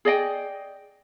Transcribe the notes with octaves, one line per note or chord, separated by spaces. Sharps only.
G#4 D5 D#5 G5